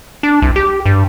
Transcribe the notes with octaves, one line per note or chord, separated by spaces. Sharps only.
D4
C2
G4
G2